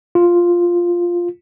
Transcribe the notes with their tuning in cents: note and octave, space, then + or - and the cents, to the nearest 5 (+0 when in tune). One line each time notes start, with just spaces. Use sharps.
F4 +0